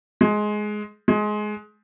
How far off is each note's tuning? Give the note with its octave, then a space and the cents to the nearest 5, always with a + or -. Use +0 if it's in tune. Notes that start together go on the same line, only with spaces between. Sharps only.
G#3 +15
G#3 +20